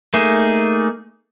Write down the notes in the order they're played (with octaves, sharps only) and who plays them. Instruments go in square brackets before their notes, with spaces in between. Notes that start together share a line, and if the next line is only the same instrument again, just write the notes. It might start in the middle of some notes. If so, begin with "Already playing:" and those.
[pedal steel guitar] A3 A#3 D#4 G#4